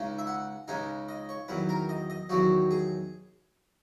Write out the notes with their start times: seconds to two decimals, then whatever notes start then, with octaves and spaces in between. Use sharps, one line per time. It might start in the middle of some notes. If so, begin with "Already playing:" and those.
Already playing: C#2 C#3 G#3 D#4
0.18 E5
0.27 F#5
0.68 C#2 C#3 G#3 D#4 G#5
1.09 D#5
1.29 C#5
1.48 E2 D#3 F#3 B4
1.69 A#4
1.89 D#5
2.10 D#5
2.29 E2 D#3 F#3 F#4
2.71 G#4